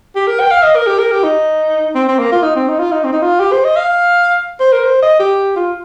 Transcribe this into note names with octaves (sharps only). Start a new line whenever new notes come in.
G4
A#4
G5
F5
D#5
A#4
G4
A#4
G4
D#4
C4
C4
A#3
F4
D#4
C4
D#4
F4
D#4
C4
D#4
F4
G4
C5
D#5
F5
C5
A#4
C5
D#5
G4
F4